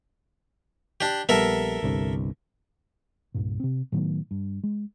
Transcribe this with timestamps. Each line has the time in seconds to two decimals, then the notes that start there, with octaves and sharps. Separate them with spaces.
1.01 D4 G4
1.29 A#1 G3 B3 A4 A#4 E5
1.83 G1 C2 G2
3.34 C2 G2 A#2
3.60 C3 C4
3.92 A2 D#3 F#3 B3
4.31 G2
4.63 G#3